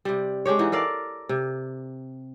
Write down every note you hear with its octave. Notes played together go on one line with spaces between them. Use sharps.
C3 G3
G#3 D4 G4 C#5
E3 D#4 F#4
A4 A#4 D5 F5
C3